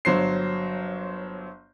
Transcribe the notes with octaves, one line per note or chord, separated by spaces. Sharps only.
G1 F#3 C5 C7